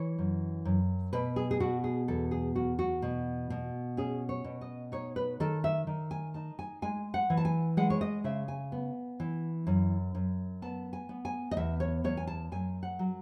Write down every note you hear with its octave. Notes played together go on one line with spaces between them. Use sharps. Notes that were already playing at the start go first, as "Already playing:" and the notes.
Already playing: E3 C#5
F#2
F#2
B2 B4
G#4
G#4
B2 F#4
G#4
E2 A4
G#4
E2 F#4
F#4
B2
B2
C#4 G#4
C#5
B2
D#5
D#4 C#5
B4
D#3 A4
E5
D#3
G#5
D#4 A5
G#5
G#3 G#5
F#5
E3
A5
G#5
G#3 F#5
C#5
D#5
C#3 E5
G#5
B3
E3
F#2
F#2
B3 A5
G#5
B3
G#5
D#5
E2 E5
C#5
E2 C#5
G#5
A5
F#2 G#5
F#5
F#3